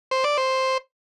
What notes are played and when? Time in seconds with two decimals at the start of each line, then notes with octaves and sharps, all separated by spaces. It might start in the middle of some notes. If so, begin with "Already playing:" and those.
0.11 C5
0.24 D5
0.38 C5